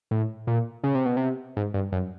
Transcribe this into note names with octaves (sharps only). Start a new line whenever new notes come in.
A2
A#2
C#3
C3
B2
C3
G#2
G2
F#2